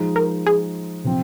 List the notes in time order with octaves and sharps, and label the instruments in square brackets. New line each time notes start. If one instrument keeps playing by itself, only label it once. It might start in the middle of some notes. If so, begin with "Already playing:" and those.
Already playing: [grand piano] F3 G#3 D#4
[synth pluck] A#4
G#4
[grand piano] C3 F3 C4